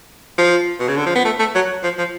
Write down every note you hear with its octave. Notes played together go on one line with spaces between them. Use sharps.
F3
B2
C#3
D3
F3
B3
A3
A3
F#3
F3
F3